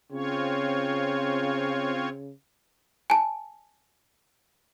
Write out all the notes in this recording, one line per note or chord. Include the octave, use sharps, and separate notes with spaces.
C#3 C4 F4 C#5
G#5 A5